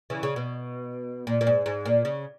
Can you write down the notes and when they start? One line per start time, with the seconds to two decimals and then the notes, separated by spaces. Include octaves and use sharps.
0.10 C#3 E3
0.23 C#3
0.36 B2
1.27 A#2
1.41 A#2
1.47 G#2
1.66 G#2
1.86 A#2
2.05 C#3